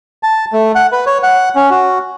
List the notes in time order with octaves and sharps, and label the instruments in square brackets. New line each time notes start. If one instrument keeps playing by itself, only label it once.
[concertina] A5
A3
F#5
B4
C#5
F#5
C#4
F#4